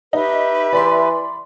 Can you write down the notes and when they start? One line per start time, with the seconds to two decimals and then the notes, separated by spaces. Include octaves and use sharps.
0.13 D#4 G4 B4 E5
0.73 E3 D5 B5 C6